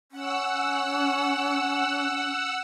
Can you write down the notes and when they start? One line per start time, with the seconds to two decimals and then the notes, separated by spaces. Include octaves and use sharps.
0.12 C#4 F#5 E6